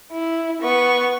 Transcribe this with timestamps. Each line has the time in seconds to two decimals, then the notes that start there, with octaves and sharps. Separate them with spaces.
0.13 E4
0.62 B3 C#6